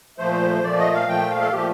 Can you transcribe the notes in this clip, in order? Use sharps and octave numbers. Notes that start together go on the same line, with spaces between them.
A#2 F3 A3 C5
A#2 F3 A3 D5
D#5
F5
A#2 F3 A3 G5
F5
A4
A#2 F3 A3 G4